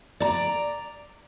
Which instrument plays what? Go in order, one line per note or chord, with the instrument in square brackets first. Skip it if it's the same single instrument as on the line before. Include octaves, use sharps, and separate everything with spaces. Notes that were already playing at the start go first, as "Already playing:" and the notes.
[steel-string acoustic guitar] D5 A#5